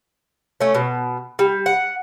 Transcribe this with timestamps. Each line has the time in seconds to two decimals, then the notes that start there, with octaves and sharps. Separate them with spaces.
0.61 A3 C#4
0.74 B2
1.39 G3
1.66 F#5